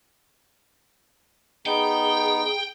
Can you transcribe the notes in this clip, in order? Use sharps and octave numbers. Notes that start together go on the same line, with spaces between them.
B3 D#4 G#4 G5